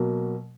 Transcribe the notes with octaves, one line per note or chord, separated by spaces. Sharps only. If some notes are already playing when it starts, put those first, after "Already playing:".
Already playing: B2 F#3 A#3